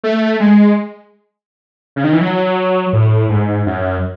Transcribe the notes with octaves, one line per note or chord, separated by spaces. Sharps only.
A3
G#3
C#3
D#3
E3
F#3
A2
G#2
F#2